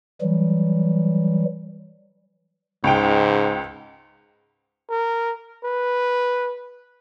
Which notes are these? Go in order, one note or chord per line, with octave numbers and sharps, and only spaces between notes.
E3 F#3 G3
C#2 G#2 G5
A#4
B4